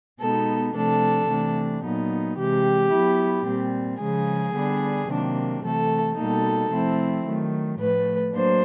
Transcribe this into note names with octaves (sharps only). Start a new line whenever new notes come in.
B2 G#3 B3 D#4 A4
C3 F3 A3 D4 A4
C3 E3 A3 D4
A#2 F#3 B3 D#4
C3 E3 G#3 G4
F#3 B3 E4
A#2 G3 C4
C#3 F3 G#3 G#4
D3 G3 B3 D4
C3 D#3 F#3 A#3 D4
C3 E3 A3 A4
B2 G3 A#3 D#4 A4
C3 F3 A3 C4 E4
D#3 F#3 A3
A2 F3 A3 B4
F#3 A#3 D4 C5